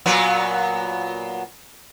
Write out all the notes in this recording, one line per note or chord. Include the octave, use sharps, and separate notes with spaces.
A#2 F#3 B3